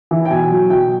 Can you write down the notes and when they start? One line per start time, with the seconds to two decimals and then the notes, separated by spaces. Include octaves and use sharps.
0.11 E3
0.25 G5
0.30 B2 G#5
0.51 F#3
0.70 B2 G5